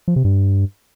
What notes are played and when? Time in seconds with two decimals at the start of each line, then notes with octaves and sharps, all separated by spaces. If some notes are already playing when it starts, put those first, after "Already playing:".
0.08 F3
0.16 C3
0.25 G2